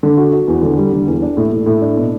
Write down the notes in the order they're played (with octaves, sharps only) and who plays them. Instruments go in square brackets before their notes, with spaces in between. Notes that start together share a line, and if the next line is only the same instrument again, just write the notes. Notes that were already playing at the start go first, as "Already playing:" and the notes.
[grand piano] D3
F#4
F#4
E2
D3
G3
D3
E2
D4
A2
A2
A2
D4
B2